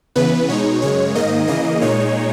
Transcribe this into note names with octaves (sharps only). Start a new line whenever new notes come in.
C#3 E3 B3 B4
B2 G#3 D#4 C#5
F#2 C#3 G#3 C#5
G#2 D#3 A#3 D#5
C#3 E3 A#3 D#5
A#2 G#3 D#4 C#5